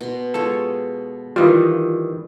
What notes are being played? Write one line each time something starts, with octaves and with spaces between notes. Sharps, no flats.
B2 C6
G#3 F4 A4 C#5
D#3 E3 G3 F4 C5 D#5